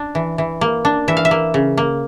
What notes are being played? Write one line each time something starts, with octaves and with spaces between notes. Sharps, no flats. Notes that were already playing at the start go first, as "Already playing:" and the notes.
Already playing: D4
E3
E3
A#3
D4
E3 E5
F5
E5
A#3
C#3
A#3